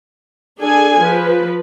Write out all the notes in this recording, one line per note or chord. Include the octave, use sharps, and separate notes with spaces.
D4 G#4 A4 G#5
F3 B4